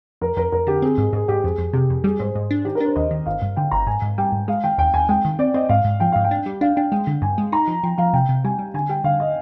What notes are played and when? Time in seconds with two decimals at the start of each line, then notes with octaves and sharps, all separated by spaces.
0.21 F2 A#4
0.37 F2 A#4
0.52 F2 A#4
0.67 D3 G4
0.82 C4 G#4
0.98 G#2 G#4
1.13 G#2 G#4
1.28 G#2 G4
1.44 F2 G#4
1.58 F2
1.73 C3 G4
1.90 F2
2.04 G3 G#4
2.19 G#2 C5
2.35 G#2
2.51 D4
2.65 D#3 G4
2.75 A#4
2.80 D4
2.85 C5
2.96 D#2 D#5
3.11 D#3
3.26 G1 F5
3.42 G2
3.56 D3 G5
3.71 G1 A#5
3.87 G#2 G#5
4.02 G#2
4.18 G3 G5
4.32 G#2
4.48 G#3 F5
4.63 D#3 G5
4.78 D#2 G5
4.94 D#2 G#5
5.09 G#3 G5
5.25 D#3
5.39 C4 D5
5.54 C4 D#5
5.69 G#2 F5
5.85 G#2
6.00 F3 G5
6.12 G#2 F5
6.24 G5
6.31 D4
6.46 G3
6.61 D4 F5
6.76 D4 G5
6.91 G#3 G5
7.07 D3
7.22 G2 G#5
7.38 G#3
7.52 D#4 A#5
7.67 F3
7.83 F3 G5
7.98 F3 F5
8.13 C3 G5
8.29 C3
8.44 G3 G#5
8.59 G3
8.74 D3 G#5
8.89 G3 G5
9.04 D3 F5
9.20 D#5